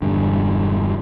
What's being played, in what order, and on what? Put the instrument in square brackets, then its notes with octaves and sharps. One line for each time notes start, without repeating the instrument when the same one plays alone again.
[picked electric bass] E1 G2 D3